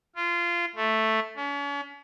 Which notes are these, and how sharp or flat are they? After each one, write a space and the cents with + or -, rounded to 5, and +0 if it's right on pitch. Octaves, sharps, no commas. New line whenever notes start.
F4 -20
A3 +0
C#4 +40